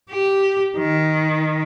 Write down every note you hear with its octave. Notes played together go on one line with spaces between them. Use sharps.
G4
D#3